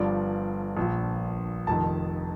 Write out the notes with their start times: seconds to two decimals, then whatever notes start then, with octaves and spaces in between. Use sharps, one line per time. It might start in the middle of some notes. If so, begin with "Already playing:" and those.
Already playing: G1 G2 F3 D5
0.77 A#1 A#2 F3
1.67 F1 F2 D#3 A5